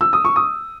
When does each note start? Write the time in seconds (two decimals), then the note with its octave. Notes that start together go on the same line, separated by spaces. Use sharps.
0.01 E6
0.13 D#6
0.25 C#6
0.36 D#6